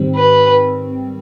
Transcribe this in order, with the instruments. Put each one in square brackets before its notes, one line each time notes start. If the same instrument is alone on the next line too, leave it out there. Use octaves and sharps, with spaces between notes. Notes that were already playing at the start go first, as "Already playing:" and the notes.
Already playing: [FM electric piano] G#2 D#3 G3 C4
[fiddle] B4